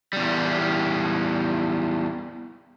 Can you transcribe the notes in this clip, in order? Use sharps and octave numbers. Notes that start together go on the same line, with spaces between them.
E2 G3